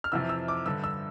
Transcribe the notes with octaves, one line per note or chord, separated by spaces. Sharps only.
F6
F2 C3 E3 E6
E6
D6
G2 D3 E6
E6